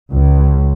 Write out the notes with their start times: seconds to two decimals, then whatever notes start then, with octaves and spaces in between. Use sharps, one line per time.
0.12 C#2